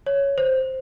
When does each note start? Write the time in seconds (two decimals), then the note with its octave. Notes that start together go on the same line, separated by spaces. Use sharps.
0.06 C#5
0.38 C5